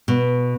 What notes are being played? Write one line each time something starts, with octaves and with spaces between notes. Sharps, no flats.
B2